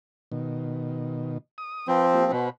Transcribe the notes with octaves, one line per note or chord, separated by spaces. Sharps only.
B2 D#3
D#6
F3 C4 B4 G5
A#3 F4 G4
B2 C5 F#5 B5